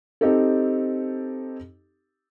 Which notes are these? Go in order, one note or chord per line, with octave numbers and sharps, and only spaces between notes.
C4 D#4 G4 A4